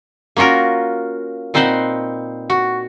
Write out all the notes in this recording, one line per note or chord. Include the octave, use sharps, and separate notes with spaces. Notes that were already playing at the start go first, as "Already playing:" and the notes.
A#3 C#4 F4 F#4 A#4
A#2 C4 D#4 B4 C5 F#5
F#4